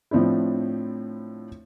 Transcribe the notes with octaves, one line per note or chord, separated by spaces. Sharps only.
A2 F3 C4 D4 E4